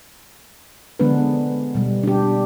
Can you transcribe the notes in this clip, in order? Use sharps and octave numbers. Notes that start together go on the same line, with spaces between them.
D3 F3 G#3 B3 D4 B4
B2 G3
D4 G4